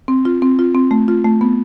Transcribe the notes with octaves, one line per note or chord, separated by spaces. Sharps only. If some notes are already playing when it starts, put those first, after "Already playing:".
C4
F4
C4
F4
C4
A3
F4
A3
B3